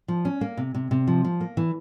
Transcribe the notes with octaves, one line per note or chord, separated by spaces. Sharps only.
F3
C#4
A#3
C3
C3
C3
F3
F3
A#3
E3